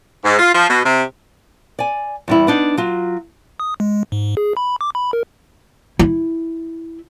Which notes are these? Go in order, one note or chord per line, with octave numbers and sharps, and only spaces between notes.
G#2
F4
F3
B2
C3
D5 G#5
E2 G3 E4
B3 D4 D#4
F#3 F4
D#6
G#3
G#2
G#4
B5
D6
B5
A#4
E4